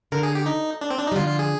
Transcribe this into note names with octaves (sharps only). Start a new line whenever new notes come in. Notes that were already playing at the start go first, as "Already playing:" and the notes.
D3 A#4
G#4
G4
D#4
D4
C4
D4
D#4
G3
D3 F3 F4
F4
G#4